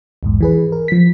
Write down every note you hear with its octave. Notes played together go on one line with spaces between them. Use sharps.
B1 E2 G#2
E3 G#4 B4
A#4
F3 B6